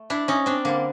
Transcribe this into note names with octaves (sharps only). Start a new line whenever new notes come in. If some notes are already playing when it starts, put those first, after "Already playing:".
Already playing: A3
D4 E4
C#4 D#4
C4 D4
D3 G3 A#3